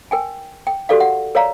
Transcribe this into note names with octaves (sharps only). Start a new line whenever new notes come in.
A#4 G5 G#5
G5
F#4 G4 A4 A#4 D5 F5
F#5
A#4 C#5 D5 F5 A#5